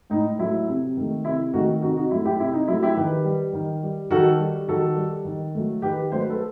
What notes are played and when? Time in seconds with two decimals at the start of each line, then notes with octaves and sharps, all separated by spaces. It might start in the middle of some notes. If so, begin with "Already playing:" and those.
0.10 A2 D#4
0.39 F#3 A3 E4
0.68 C3
0.97 D#3 A3
1.25 C3 E4
1.53 D#3 A3 D#4 F#4
1.82 C3 D#4 F#4
1.97 D#4 F#4
2.11 F#3 A3 E4
2.24 E4 G4
2.39 C3 E4
2.53 D#4
2.67 F#3 A3 E4
2.82 E4 G4
2.96 D#3 G4 B4
3.25 G3
3.53 D#3
3.83 G3
4.10 D#3 F#4 A4
4.39 G3
4.68 D#3 F#4 A4
4.96 G3
5.25 D#3
5.55 F#3 A3
5.82 D#3 G4 B4
6.12 F#3 A3 C5
6.20 B4
6.30 A4